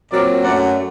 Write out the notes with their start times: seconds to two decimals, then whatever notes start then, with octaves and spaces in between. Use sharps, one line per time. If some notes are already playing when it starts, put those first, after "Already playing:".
0.11 A#2 F#3 C4 A#4 D5
0.44 F#2 F#3 A3 D5 F#5